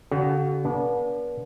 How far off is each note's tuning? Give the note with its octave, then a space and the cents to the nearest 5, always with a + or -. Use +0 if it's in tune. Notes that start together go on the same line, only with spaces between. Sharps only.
D3 -45 F#4 +30
B3 -40 D4 -30